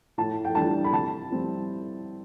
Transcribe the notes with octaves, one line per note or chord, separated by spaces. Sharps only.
A2 A5
G5
E3 G3 D4 A5
B5
C3 A5
G3 C4 E4